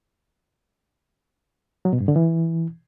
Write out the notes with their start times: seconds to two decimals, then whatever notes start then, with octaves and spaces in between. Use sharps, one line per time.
1.85 F#3
1.93 B2
2.00 G2
2.08 D3
2.16 E3